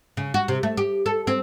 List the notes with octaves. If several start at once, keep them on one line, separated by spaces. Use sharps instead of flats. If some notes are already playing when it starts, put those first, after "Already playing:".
C#3
F#4
C3
A3
G4
A4
C4